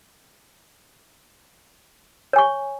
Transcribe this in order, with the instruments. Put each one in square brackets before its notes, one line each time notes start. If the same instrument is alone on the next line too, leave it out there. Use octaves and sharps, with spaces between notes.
[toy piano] C#5
G#5
C#6